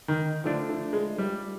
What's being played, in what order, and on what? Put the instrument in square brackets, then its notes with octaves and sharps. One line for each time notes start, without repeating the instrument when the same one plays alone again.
[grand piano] D#3
[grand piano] D3 [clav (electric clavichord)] F3 A3 D4
[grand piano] D3
G#3
G3